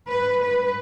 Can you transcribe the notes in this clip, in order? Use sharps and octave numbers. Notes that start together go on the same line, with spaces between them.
B4
B4